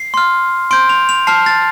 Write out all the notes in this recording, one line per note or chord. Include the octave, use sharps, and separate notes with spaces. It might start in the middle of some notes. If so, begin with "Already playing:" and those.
Already playing: C7
C6 F6
C6 G6 D7
F7
F7
A5 F6 C7
A6